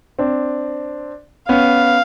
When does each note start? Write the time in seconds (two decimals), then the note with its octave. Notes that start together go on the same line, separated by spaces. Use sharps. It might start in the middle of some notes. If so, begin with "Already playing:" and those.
0.19 C4 D4
1.49 B3 C#4 F5